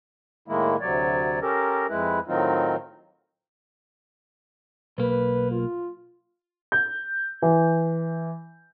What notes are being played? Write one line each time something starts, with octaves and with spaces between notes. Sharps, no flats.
A2 D#3 G#3 A#3 E4
D2 C3 F#3 C#5 D5
C#4 G4 A4 A#4 A#5
F2 G#3 E4 B4
A2 D#3 F#3 C4 D#4 F4
B1 A#3 B4
F4
G6
E3